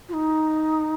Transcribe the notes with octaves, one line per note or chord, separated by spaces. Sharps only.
F4
D#4